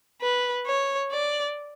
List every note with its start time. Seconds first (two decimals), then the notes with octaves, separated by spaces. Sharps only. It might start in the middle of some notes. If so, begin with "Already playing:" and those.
0.21 B4
0.66 C#5
1.11 D5